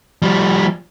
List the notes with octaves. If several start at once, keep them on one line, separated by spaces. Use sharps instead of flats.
F3 G3